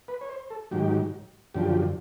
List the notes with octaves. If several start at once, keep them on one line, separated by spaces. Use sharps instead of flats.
B4
C#5
C5
A4
G#2 D#3 F#3 G4
F#2 D3 F3 G4